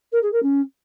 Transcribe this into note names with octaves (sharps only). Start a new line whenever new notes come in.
A#4
G#4
A#4
C#4